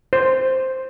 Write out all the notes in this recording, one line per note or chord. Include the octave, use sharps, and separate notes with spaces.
C5